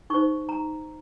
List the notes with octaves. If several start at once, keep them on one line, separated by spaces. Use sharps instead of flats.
D#4 G#4 C5 C#6
A#5